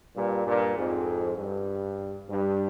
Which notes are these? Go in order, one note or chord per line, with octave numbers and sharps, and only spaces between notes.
G2 A#2
G2 A#2
F2 G#2
G2
G2